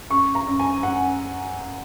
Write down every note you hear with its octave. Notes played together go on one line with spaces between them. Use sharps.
F#2 C#6
A#5
F#2
G#5
F#2 F#5